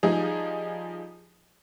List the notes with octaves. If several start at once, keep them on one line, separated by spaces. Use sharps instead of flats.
F3 G3 D#4 G#4